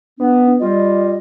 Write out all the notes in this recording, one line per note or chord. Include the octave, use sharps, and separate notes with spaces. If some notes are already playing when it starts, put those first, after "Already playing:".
B3 D4
G3 F4 D#5